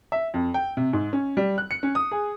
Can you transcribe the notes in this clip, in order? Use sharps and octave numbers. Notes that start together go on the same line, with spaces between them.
E5
F2
G5
C3
G#2
C#4
G3
F#6
C#7
C#4
D#6
G#4